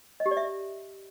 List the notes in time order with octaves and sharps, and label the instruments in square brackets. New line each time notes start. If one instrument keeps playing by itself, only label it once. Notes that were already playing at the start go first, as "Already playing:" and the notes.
[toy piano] D#5
G4
D5
E5